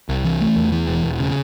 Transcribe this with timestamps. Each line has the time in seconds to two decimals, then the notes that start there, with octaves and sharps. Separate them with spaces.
0.09 C2
0.24 E3
0.41 A3
0.56 E2
0.72 E3
0.88 E1
1.04 E1
1.20 C#3